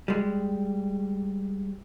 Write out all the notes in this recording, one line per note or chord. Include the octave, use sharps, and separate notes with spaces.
G3 G#3